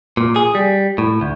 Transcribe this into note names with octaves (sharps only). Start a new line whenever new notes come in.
A#2
G#4
G3
A2
D2